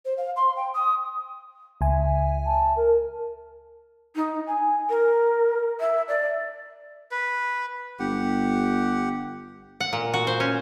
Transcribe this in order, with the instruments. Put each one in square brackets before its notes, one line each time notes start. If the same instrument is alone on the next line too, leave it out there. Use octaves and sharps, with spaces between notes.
[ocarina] C5
F5
C6
G5
D#6
[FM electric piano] C#2 G#5 [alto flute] E5
[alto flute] A5
A#4
[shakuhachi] D#4
G#5
A#4
E5
D5
[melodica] B4
[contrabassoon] G1 [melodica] G4 F#5
[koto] F#5
A#2
F#4
C5
C#4